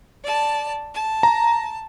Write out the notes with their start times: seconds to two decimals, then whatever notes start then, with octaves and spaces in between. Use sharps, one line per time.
0.23 D5 A5
0.93 A5
1.23 A#5